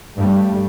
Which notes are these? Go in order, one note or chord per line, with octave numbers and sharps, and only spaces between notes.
G2 G3 A3